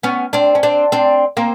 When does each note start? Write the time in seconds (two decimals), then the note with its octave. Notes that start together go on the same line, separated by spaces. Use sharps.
0.03 B3 C#4
0.33 C4 D4
0.55 C#4
0.63 C4 D4
0.92 C4 D4
1.37 A#3 C4